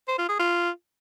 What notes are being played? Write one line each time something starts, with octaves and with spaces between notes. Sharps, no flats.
C5
F4
G#4
F4